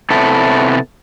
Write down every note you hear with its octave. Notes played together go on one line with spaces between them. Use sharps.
C3 B3 E4 A4